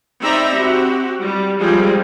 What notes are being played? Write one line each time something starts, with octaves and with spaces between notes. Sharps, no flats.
C4 D#4 D5 E5 A#5 B5
C4 F#4 G4
G3
F3 G3 G#3 C4 G#4